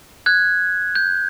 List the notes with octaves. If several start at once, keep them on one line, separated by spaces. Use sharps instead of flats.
F#6 G#6
G6